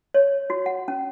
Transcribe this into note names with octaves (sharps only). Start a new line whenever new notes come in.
C#5
F#4
F#5
C#4